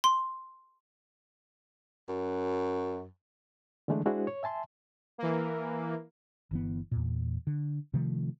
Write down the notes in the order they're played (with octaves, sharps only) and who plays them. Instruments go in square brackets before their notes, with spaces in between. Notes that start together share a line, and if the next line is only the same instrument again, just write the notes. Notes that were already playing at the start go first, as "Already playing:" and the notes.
[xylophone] C6
[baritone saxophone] F#2
[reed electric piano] D3 E3 G#3 A3 D4
G#3 D4 E4 F#4 G#4 C5
C#5
E5 G#5 A5 C6
[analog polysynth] E3 A#3
[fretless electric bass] G1 E3 B3
E2 A#2
D3
C3 D#3 F3 A3